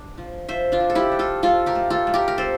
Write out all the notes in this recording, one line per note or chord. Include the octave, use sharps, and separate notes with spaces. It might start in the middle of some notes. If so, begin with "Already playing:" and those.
Already playing: D4
F3
F3 C5 E5
D4 F4
F3
A4
E4 G4
D4
F4 A4
F3 F4 A4
G4 A#4
A3
F4 A4
A3
G4 A#4
A#4
C4 A4 C5